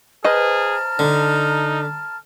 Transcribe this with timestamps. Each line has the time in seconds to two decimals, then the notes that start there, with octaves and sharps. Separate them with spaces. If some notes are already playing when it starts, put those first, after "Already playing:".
0.24 G#4 B4 C5 D#5 A5 A#5 F6
0.99 D3 D#4